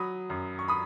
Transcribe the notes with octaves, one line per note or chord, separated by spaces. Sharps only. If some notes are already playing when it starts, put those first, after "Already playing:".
Already playing: F#3 B5 D#6
F#2
C#6
B5 D#6